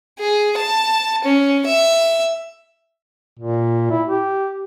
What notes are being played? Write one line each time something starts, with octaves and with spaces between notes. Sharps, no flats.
G#4
A5
C#4
E5
A#2
E4
G4